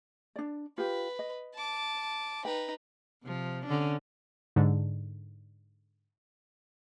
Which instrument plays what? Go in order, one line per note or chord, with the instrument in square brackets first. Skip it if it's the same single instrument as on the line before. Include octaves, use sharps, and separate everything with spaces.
[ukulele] D4 D5
[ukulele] F4 G4 [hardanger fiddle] B4
[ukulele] D#5
[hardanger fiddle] A5 D6
[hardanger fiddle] D#4 B4 [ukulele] G5
[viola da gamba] C3 F3
D3 C#4 D4
[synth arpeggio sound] G#2 D3